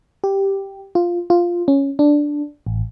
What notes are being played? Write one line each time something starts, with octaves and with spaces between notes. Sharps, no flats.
G4
F4
F4
C#4
D4
A1